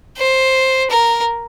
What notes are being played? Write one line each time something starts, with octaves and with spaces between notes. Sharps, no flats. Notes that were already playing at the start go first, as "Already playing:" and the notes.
C5
A#4